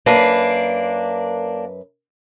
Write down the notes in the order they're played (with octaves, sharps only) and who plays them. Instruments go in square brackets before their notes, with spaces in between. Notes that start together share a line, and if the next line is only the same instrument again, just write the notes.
[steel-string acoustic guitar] F#2 B4 [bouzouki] A#3 D4